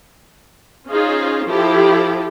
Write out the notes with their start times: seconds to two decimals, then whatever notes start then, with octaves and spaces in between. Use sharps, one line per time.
0.89 C#4 D#4 F4 G#4 C5
1.48 F3 E4 G4 A4